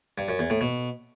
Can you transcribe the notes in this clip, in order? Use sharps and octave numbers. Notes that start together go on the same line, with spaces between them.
G2
F#2
E2
A2
B2